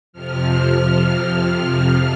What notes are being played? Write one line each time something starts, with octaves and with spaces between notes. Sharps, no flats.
F2 C3 F3 F6
F6